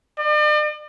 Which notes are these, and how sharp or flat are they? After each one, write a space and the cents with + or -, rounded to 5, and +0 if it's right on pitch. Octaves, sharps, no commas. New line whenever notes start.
D5 +45